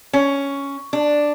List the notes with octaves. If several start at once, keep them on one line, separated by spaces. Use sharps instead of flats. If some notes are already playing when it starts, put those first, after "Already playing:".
C#4
D4